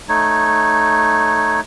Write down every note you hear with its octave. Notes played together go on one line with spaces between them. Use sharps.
A3 D#4 C#5